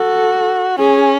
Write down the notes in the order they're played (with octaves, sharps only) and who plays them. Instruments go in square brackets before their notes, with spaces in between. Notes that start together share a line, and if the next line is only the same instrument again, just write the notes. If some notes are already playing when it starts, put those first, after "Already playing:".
Already playing: [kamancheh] F#4 [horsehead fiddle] A4
[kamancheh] C#4 [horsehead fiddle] G#4